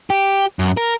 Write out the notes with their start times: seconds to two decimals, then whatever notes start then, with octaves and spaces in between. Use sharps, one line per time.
0.10 G4
0.59 F#2
0.77 A#4